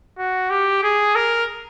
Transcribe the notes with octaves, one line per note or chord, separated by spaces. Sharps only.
F#4
G4
G#4
A#4